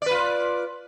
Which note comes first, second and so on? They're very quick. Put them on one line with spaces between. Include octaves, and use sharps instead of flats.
D5 B4 F4